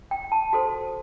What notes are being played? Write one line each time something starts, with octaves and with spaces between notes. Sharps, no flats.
G5
A5
F#4 A4 C5